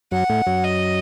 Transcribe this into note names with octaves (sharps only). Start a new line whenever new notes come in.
F#2 F#3 F#5
A2 A3
F#2 F#3
D#5